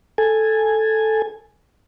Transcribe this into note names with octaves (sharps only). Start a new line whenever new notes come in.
A4 G#5